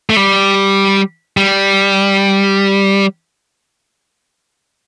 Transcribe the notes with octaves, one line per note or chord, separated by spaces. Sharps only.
A3
G3
G3